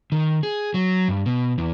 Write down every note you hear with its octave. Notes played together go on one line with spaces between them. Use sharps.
D#3
G#4
F#3
G2
B2
E2